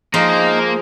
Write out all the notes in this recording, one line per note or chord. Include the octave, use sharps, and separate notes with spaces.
F3 G#3 A#3 D#4 F5 A#5